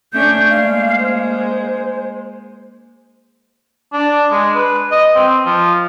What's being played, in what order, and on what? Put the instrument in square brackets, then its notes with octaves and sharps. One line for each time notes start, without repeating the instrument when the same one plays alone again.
[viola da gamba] A3 C#4 D4 [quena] G6
[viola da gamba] G#3 A#3 [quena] F5
[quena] C5
[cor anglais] D4
G#3
B4
D#5
C4
F3